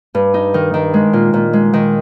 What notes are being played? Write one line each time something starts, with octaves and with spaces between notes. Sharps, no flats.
G2
D#4
D#3
D#3
G#3
A#2
A#2
G#3
D#3